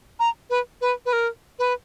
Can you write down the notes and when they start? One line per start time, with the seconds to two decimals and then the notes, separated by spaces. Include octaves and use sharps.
0.20 A#5
0.50 B4
0.81 B4
1.06 B4
1.13 A#4
1.59 B4